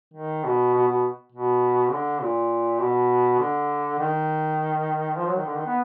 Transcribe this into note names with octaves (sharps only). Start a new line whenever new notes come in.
D#3
B2
B2
B2
B2
D3
A#2
B2
D3
D#3
F3
F#3
D#3
D3
D#3
B3